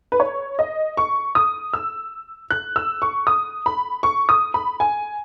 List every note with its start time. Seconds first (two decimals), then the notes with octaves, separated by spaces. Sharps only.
0.12 B4
0.20 C#5
0.59 D#5
0.97 C#6
1.35 D#6
1.74 E6
2.50 F#6
2.76 E6
3.02 C#6
3.27 D#6
3.66 B5
4.03 C#6
4.29 D#6
4.54 B5
4.80 G#5